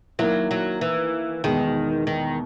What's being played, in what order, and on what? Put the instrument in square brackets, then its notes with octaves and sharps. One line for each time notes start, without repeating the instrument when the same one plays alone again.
[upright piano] D#3 A#3 E4 [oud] F#3
[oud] F#3
E3
[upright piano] E2 B2 G#3 [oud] D#3
[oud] D#3